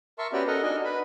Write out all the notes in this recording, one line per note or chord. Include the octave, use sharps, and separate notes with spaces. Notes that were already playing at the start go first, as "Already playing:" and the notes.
A#4 E5 A5 C6 C#6
B3 C#4 F#4 G4 D5 G5
A4 A#4 D#5 F#5 A#5
D4 D#4 F#4 D#5 G#5
B4 B5